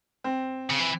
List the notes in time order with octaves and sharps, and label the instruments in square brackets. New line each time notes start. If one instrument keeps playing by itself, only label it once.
[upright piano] C4
[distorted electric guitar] C#3
E3